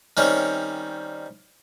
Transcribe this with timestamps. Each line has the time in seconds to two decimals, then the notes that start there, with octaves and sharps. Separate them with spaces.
0.17 D#3 G3 C4 C#4 C#5